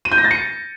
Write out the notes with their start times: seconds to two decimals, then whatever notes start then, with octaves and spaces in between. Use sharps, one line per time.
0.05 D#7
0.12 G6
0.18 A#6
0.24 A6
0.31 C#7